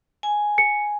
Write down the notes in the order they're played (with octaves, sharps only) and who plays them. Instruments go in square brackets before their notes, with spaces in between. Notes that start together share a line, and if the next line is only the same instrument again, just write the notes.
[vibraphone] G#5
[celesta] C#7